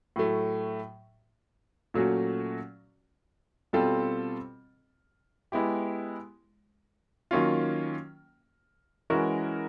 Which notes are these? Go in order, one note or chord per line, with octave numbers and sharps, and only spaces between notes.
A2 F#3 A3
A#2 F#3 A3 C#4 F#4
B2 G3 C4 F4 A4
G#3 B3 E4 G4
D#3 F#3 A#3 C#4 F4
E3 G#3 C#4 F#4 A#4